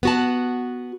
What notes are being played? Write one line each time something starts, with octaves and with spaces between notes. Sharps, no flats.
B3 F#4 A5